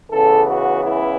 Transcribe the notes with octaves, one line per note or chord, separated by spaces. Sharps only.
C#2 C#3 E3 B3 A4
F#4
E4